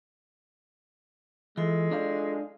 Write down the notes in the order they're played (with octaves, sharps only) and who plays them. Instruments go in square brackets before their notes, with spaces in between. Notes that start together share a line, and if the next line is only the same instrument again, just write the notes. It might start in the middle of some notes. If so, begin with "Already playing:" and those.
[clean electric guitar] E3 [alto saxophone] G#3 [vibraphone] E4 F4 A4
[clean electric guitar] D4 D5 F5